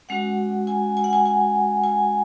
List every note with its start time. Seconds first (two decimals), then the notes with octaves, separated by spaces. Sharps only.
0.09 G#3 C#4 F#4 F#5
0.67 G#5
0.97 G#5
1.04 F#5
1.13 G#5
1.26 G#5
1.84 G#5